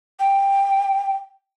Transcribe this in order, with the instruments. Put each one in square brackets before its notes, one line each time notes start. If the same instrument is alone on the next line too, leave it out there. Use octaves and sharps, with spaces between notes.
[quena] G5